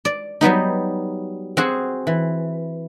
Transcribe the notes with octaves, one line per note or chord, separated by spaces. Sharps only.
D5
F#3 G3 B3 D#4
C4 F#4 G#4 F#5
E3